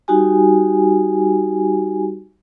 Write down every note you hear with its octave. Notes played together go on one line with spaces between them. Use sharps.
G3 D#4 F#4 G4 G#5